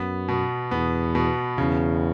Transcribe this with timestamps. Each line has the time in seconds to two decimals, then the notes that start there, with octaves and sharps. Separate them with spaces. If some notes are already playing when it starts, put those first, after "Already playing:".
Already playing: F#2 B3
0.28 B2
0.71 E2 B3
1.15 B2
1.58 E2 C#3